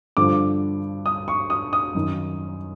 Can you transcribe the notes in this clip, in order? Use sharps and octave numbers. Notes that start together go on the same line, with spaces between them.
G2 D3 F3 D6
D#6
C#6
D#6
D#6
F#2 D#3